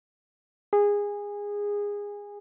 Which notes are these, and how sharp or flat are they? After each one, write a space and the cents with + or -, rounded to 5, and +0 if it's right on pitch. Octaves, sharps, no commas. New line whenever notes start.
G#4 -20